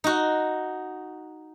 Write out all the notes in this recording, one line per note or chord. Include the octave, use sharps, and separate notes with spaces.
D#4 F#4